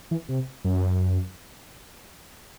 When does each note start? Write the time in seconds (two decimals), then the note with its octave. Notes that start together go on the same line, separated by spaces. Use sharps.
0.11 E3
0.29 C3
0.65 F#2